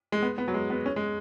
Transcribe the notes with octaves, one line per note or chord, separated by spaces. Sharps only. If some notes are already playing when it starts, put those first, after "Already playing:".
G#3
B3
B3
F#3
G#3
B3
C#4
G#3